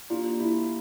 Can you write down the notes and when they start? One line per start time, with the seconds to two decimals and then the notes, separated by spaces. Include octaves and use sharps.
0.09 A#3 D4 F4 G4 D5
0.40 E4